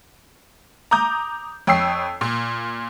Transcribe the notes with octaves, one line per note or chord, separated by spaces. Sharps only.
A#5 D6 D#6 G6
F2 C#5 G5 D#6 E6 C7
A#2